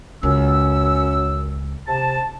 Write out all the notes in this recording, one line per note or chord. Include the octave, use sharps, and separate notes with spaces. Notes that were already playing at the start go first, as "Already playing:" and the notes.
C#2 F#2 C#4 E6
C3 A5